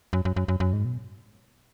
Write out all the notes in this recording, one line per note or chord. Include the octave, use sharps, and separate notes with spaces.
F#2
F#2
F#2
F#2
F#2
G#2
B2